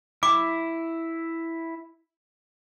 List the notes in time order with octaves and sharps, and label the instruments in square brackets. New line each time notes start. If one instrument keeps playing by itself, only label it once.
[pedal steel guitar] E4 [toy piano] D6